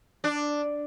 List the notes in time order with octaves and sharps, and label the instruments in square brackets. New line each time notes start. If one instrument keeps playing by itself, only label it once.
[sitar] D4